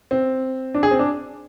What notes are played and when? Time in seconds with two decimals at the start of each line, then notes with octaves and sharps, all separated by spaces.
0.11 C4
0.74 D4
0.83 G#4
0.91 C4
0.99 D4